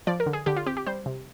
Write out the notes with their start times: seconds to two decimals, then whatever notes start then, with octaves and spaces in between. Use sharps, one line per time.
0.07 F3 D5
0.20 A#4
0.26 D3
0.33 G#4
0.46 D3 G4
0.56 F4
0.66 C4 G4
0.77 G4
0.86 G3 C5
1.06 C3